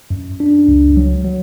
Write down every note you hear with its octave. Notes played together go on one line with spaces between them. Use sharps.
F#2
D4
C#2
F#3
F#3